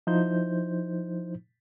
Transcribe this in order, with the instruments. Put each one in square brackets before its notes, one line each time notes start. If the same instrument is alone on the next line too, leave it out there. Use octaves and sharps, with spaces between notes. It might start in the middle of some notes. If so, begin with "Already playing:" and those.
[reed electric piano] F3 D#4 E4 C5 G6